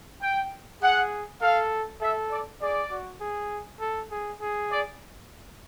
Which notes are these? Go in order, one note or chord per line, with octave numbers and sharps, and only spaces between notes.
G5
G#4 F#5
A4 F5
A4 E5
D5
G#4 D5
F#4
G#4
A4
G#4
G#4
D5